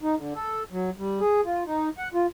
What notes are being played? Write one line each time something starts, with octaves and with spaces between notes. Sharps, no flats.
D#4
D3
A4
F#3
G3
G#4
F4
D#4
F#5
F4